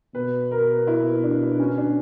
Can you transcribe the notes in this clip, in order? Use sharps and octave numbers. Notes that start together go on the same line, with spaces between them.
B2 B4
A#4
E4
D4
C#4
D4